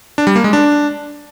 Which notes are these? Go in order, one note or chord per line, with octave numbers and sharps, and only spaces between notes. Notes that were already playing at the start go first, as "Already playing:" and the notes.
D4
G3
A#3
G#3
D4